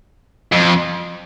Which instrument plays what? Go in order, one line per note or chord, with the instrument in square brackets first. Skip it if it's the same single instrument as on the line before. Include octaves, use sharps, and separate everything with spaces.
[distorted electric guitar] F2